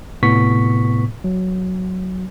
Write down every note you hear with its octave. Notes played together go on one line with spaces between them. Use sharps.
A2 C3 B3 C#6 B6
F#3